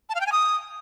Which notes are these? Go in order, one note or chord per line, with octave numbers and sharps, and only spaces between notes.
A5
F5
G5
G#5
D#6